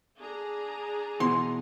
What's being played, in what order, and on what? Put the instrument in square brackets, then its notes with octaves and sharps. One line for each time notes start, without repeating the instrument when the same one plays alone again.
[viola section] D4 G#4 A#5
[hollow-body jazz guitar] B2 E3 [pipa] C6